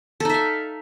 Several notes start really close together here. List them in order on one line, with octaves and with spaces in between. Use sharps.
A4 D#4 E5 F5